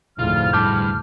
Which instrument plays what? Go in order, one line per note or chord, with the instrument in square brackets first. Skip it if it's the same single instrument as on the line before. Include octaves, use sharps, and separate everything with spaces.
[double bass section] F1 D2 A2 [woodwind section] G#3 E4 F6 [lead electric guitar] F4
[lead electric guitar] G2 [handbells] A5 D6 G6